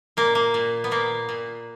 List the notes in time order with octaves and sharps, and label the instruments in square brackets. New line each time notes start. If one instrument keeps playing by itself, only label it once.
[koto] A#2 A#3
A#3
A#2
B3
A#2 A#3
A#2